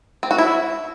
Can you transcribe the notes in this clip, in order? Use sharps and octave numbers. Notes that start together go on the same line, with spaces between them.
C4
F#4
E4